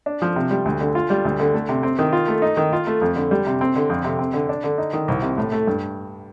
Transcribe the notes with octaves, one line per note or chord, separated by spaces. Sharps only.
D4
F3
C3
G3
D2
D3
F4
G3
D2
D3
A3
C3
C4
D#3
F4
A3
D#4
D#3
F4
A3
F2
D3
G3
C3
C4
D3
F2
C3
C4
D3
D4
D3
D#4
D#3
C2
C3
A2
A3
G2